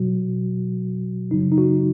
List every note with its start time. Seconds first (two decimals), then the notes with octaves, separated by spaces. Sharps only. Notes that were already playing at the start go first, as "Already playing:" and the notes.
Already playing: B2 F#3 F#4
1.31 F#2 C#3 F#3 D#4
1.52 D#4
1.58 F#4